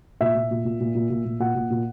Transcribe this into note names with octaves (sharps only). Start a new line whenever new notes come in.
A#2 E5
A#2
A#2
A#2
A#2
A#2
A#2
A#2
A#2 F#5
A#2
A#2